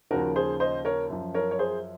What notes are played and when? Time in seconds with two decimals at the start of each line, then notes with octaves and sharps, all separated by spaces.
0.11 D#2 C#3 F3 F#4 A#4
0.36 G#4 C5
0.60 C5 D#5
0.85 A#4 C#5
1.10 F#2 F3
1.34 A#4 C#5
1.51 C#5
1.59 G#4 C5